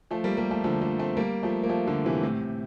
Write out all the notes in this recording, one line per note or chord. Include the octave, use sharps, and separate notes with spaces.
F3 A3
G3 A#3
G3 A#3
F3 A3
D3 F3
F3 A3
A3 C4
G3 A#3
F3 A3
A#3
F3 A3
D3 F3
C3 E3
A2 C3
A2